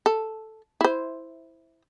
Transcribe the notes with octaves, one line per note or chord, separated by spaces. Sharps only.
A4
E4 C5